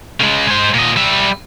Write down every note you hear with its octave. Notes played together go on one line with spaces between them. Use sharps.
C#3 G#3
G#3 C5
A#2 D#5
G3 E5